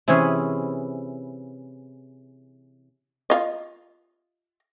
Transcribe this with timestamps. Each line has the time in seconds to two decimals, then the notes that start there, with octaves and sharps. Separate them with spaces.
0.08 C3 E3 C#4 E4 G#4 B4
3.30 F4 D#5